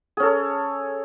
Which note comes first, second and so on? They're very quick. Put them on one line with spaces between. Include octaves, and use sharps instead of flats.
G#4 C#4 A4 C#5